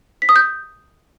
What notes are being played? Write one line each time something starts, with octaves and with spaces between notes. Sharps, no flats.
B6
D#6
G6